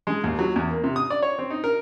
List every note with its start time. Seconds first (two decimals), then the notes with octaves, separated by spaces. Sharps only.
0.07 G#3
0.24 D#2
0.39 F#3
0.56 E2
0.71 A#3
0.84 C3
0.96 D#6
1.10 D5
1.22 C#5
1.39 C4
1.50 D#4
1.64 A#4